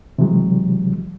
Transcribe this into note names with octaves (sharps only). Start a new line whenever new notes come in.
C3 E3 F#3 G#3